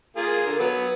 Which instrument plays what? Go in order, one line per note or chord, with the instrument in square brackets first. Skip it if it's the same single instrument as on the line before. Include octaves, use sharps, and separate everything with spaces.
[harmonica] A#3 F4 G#4
D3 A#4
F#3 B3 B4